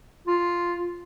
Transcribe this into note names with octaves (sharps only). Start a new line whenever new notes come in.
F4